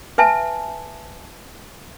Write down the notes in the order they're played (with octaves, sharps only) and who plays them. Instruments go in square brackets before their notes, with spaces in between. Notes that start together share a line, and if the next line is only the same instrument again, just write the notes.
[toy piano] B4 E5 G#5 A5